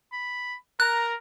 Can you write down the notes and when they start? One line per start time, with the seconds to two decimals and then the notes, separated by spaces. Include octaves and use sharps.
0.12 B5
0.80 A#4 A#5 F#6